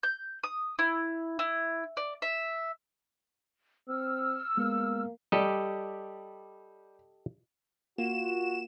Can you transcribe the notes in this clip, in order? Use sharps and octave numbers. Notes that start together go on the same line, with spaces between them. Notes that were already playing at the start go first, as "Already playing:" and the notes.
G6
D#6
E4
E4
D5
E5
C4 E6 F6
G#3 A#3 B3
G3 G4 A4 D#5
A#3 F4 F#4 E7